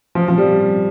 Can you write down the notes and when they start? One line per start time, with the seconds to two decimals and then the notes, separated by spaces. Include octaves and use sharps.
0.15 F3
0.28 F3
0.38 G3